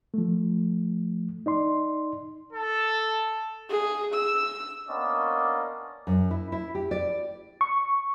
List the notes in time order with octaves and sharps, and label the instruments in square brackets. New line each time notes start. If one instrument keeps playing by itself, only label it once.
[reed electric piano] F3 A3
D#4 D5 C6
[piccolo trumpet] A4
[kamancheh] G#4
E6
[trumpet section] A#3 B3 C#4 D4 D5 D#5
[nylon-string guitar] F#2
E4
E4
G4
D5
[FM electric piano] C#6